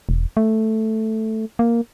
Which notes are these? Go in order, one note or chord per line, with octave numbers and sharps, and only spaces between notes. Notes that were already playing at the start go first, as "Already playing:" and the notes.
E1
A3
A#3